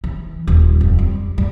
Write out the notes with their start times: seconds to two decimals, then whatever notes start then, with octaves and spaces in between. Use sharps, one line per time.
0.04 E3
0.47 D#1
0.81 F2
0.99 G3
1.38 G3